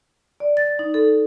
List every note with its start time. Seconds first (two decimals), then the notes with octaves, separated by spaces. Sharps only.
0.40 D5
0.57 A6
0.79 D#4
0.94 A4